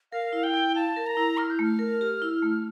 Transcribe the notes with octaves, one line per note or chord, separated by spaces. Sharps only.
A#4 F5
E4
G5
E4
F5 A5
A#4
A#5
E4
E4 F6
G6
A3 F6
A#4
G4
E4
A3